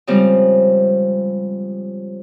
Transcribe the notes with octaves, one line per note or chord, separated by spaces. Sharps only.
C#3 F3 G3 G#3 C4